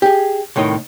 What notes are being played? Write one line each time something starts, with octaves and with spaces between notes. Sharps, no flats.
G4 G#4
C2 A2 D#3 C#5 D#5